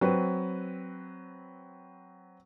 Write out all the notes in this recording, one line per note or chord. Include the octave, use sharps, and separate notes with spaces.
F#3 C4 B4